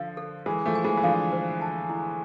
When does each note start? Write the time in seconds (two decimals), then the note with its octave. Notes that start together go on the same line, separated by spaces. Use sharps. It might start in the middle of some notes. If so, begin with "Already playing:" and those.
Already playing: D3 F3 F5
0.17 A4
0.46 E3 G#3 A4
0.66 F3 A3
0.75 G#5
0.84 E3 G#3
0.97 E3
1.03 D3 F3 F5
1.32 C5
1.61 A5
1.90 E4